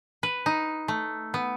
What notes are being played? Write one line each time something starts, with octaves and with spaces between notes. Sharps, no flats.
B4
D#4
A3
B3